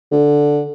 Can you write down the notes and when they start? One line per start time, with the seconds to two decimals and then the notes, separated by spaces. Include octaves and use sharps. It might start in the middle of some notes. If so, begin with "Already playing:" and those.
0.11 D3